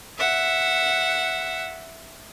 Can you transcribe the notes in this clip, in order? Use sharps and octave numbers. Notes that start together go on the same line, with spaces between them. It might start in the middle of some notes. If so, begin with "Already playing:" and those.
E5 F#5